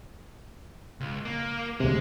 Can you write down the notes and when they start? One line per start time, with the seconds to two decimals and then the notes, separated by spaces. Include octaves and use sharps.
1.00 C#2
1.25 A#3
1.80 D2 C3 G#3